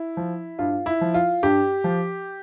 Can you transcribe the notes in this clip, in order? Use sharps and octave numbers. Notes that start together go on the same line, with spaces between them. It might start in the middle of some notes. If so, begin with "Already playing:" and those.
Already playing: E4
F3
G2 F4
E4
F3
F4
G2 G4
F3